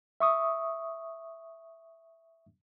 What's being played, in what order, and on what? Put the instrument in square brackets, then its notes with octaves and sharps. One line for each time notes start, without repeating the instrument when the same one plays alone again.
[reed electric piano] E5 C#6 D#6